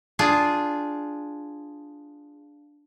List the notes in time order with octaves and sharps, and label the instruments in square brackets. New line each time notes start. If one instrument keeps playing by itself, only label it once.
[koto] D4 F4 G#4